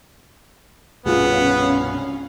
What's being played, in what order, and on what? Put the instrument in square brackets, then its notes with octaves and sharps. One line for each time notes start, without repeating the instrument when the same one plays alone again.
[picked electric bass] C2 G2 B2 [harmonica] B3 [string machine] C#4 F5 [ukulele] F4 G#4